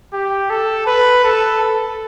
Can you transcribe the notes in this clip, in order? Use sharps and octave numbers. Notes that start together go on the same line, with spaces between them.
G4
A4
B4
A4
A4